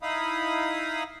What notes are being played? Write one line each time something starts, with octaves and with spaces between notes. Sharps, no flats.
D#4 E4 F5 B5 D#6